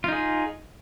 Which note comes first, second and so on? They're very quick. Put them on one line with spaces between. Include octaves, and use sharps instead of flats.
F4 D#4 G#4